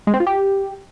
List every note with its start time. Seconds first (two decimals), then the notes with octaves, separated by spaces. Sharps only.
0.07 G#3
0.14 C4
0.20 F4
0.27 G4